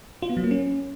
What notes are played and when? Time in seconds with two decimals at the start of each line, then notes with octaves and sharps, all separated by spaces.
0.22 F4
0.30 B3
0.37 F#3
0.44 A#3
0.51 C#4